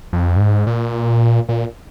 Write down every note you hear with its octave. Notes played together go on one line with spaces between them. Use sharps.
F2
G2
G#2
A#2
A#2